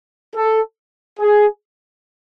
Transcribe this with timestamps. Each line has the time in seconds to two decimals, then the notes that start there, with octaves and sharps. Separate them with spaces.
0.34 A4
1.20 G#4